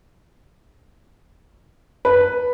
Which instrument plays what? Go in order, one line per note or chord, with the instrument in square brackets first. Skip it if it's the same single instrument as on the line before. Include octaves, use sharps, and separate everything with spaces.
[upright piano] B4